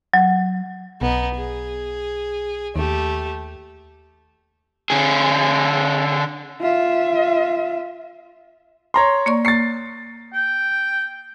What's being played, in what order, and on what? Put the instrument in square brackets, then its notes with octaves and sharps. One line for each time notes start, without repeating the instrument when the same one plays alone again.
[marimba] F#3
[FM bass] B1 [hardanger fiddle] B3 D#4
[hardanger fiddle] G#4
[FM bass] D#2 [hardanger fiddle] A3 G4
[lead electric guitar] D3 G#4
[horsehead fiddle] F4 E5
[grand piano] C#5 A#5 C6
[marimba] A#3 D5 C#6
[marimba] A#3 C#6 [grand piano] A6 C7
[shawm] G5